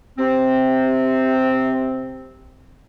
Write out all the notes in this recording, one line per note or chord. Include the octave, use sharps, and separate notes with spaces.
C3 C4